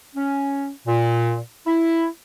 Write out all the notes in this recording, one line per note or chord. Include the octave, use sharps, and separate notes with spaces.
C#4
A#2
E4